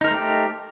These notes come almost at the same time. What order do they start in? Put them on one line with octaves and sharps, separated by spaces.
D#4 A#4 C5 A3 G4